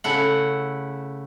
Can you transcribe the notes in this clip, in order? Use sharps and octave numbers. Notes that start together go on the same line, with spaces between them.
C#3 A3 E4 F#5